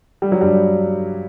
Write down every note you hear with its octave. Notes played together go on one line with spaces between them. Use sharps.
G3
F#3
G2 G3